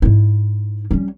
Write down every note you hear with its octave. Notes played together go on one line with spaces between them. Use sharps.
G#2 E4
G3 C#4